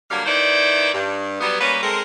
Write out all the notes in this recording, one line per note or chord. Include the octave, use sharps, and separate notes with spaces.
D3 F#3 G3 A#3 F5
D#3 D#4 E4 B4 C5 D5
G2
F#3 G3 B3
G3 A#3 B3 C#4 B4
G#3 C4 A4 A#4